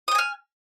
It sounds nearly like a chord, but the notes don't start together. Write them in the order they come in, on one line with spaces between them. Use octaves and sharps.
D#6 G5 G#5 F6